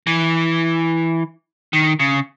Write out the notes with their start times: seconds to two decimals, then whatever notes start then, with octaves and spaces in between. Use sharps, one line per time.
0.07 E3
1.73 D#3
2.00 C#3